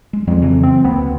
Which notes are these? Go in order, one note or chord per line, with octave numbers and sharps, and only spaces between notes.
G#3
F2 F3 G#3
C#3 E3 F#3
C4
D2 A#3 B3